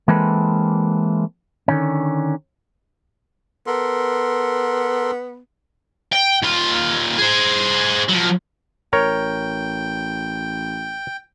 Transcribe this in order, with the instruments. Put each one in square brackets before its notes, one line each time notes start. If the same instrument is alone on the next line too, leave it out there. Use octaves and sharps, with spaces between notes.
[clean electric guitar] E3 G#3 A#3 C4 A4 B4
D3 D#3 C#4
[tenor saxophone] B3 [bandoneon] A4 A#4 C6
[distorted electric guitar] G5
D#2 F4
G#4 C5
F3 F#3
[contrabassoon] A1 [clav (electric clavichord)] A#4 C#5 [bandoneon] G5